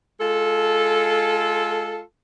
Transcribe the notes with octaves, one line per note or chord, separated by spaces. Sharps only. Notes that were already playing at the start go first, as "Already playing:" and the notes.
G#3 F4 A4